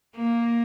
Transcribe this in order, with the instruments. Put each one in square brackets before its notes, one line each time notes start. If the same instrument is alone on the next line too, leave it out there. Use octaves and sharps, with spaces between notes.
[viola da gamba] A#3